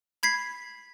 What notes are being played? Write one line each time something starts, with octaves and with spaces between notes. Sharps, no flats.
B5 G#6 B6 C7